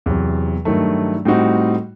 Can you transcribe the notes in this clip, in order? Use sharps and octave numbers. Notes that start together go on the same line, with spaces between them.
E2 C3 F#3
G2 D#3 F#3 A3
A2 G3 C4 D#4 F#4